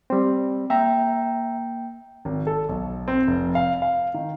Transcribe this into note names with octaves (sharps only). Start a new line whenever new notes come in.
G3 C4
A#3 E5 G5 A#5
G#1
A4
B1
C4
F1
F5
F5
D#3